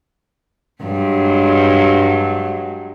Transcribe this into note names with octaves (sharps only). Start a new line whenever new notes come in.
G2 F#3 G#3